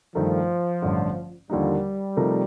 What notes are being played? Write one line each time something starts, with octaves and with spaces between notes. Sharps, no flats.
G2 D#3 F3 A3 D#4
A1 G2 D3
D#2 D3 F3 G3 A#3 D#4
C3 F3 A3 D#4 A#4